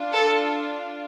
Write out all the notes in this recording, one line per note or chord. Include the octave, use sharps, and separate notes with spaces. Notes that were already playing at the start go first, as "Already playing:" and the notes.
Already playing: D4 F4
A4